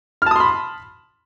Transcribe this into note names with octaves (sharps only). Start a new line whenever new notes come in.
A5 B5 C6 D#6 F6